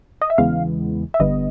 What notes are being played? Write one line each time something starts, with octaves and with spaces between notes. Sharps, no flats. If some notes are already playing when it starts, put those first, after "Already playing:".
D#5
E5
E2 C#3 E3 G#3 B3 F5
E5
G1 G2 D3 G3 B3 D#5